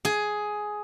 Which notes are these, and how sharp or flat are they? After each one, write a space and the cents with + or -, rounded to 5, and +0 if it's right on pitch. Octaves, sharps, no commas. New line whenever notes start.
G#4 +10